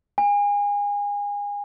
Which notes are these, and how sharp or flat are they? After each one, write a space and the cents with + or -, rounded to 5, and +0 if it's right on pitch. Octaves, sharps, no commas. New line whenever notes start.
G#5 -30